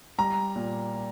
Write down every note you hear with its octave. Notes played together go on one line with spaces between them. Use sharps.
G3 A#5
A#2